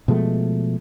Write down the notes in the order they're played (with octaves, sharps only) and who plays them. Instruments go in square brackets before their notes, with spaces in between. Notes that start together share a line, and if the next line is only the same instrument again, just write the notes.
[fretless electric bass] B2 F3 G#3 A3